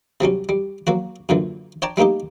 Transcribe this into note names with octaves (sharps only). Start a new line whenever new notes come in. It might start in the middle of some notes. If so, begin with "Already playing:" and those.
C3 F#3 G3 C#4
G3
F#3 A#3 F#4
F#2 A#2 D3 E3
C#5 D5 G5 A5 A#5
G3 A3 A#3 D#4 G4